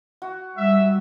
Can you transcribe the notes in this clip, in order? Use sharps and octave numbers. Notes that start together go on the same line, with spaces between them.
F#4
G3 E5